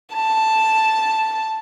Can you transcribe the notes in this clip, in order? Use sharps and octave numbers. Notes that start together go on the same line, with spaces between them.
A5